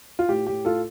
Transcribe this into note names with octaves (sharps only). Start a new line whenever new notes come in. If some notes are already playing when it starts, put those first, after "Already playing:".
F4
A2 G4
A2 G4
A2 F4 A4